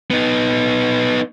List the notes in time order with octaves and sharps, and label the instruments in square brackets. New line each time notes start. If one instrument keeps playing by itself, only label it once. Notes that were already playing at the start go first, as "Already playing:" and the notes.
[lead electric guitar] B3 D#4